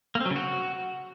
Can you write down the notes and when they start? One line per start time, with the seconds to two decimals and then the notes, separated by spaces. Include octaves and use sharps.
0.15 A#3
0.20 C4
0.26 F#3
0.31 C#3
0.36 F#4